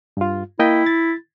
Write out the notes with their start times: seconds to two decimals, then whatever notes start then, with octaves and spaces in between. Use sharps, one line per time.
0.17 G2 F4
0.59 A#3 E4 D#5 G5
0.86 A6